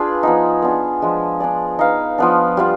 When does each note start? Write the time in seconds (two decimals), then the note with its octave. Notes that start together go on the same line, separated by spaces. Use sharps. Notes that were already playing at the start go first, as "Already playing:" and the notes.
Already playing: D4 F4 G#4 B4
0.23 F3 B3 D#4
0.62 B3 D4 G#4
1.02 F3 G#3 D4
1.40 D4 G#4 D5
1.79 D#4 B4 F5
2.18 F3 B3 D4
2.57 G3 B3 F4